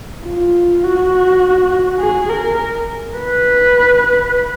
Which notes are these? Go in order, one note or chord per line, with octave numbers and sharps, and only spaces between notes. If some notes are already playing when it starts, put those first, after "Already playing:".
F4
F#4
G#4
A#4
B4